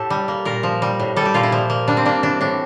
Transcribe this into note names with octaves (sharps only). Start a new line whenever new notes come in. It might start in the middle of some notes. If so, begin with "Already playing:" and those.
Already playing: A2 G4 A4
G3
A#3
A#2 A#4
F3
G3
A2
G3 A4
G4
A#2 F4
E4
F3
A#3
G3 D4
C4
A#3 D4
E3 D4
A2 D4